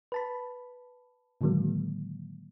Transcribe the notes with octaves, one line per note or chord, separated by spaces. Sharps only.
B4 A5 B5
A2 D3 D#3 F#3 G#3 A#3